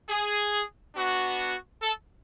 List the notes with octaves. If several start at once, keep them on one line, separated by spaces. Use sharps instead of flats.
G#4
B3 D4 F#4
A4